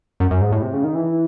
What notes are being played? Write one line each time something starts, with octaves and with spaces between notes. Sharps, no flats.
F#2
F#2
G#2
A2
C3
C#3
D#3
E3